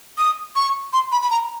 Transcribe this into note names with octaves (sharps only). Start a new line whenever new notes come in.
D#6
C#6
C6
B5
B5
A#5